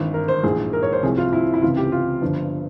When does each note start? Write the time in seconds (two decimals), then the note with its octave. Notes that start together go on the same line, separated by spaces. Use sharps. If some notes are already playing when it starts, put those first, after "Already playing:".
Already playing: G#1 G2 E3
0.14 A#4
0.28 C5
0.43 A#1 G#2 E3 G#4
0.73 A#4
0.82 C#5
0.93 C5
1.02 C2 C3 F3 G#4
1.18 F4
1.33 E4
1.54 E4
1.62 C#2 C3 E3 F4
1.77 G4
1.92 F4
2.21 G1 G2 F3